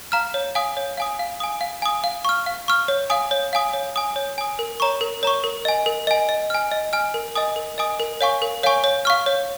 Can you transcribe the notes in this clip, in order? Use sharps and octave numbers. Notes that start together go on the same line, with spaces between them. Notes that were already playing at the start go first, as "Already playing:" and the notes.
F5 A#5 F6
C#5
F5 G#5 D#6
C#5
F5 G#5 D#6
F5
G#5 D#6
F5
G#5 D#6
F5
C#6 F6
F5
C#6 F6
C#5
F5 G#5 D#6
C#5
F5 G#5 D#6
C#5
G#5 D#6
C#5
G#5 D#6
A#4
C#5 A#5 C#6
A#4
C#5 A#5 C#6
A#4
D#5 G#5
A#4
D#5 G#5
D#5
G#5 F6
D#5
G#5 F6
A#4
D#5 G#5 D#6
A#4
D#5 G#5 D#6
A#4
C#5 F5 G#5 C#6
A#4
C#5 F5 G#5 C#6
C#5
F5 C#6 F6
C#5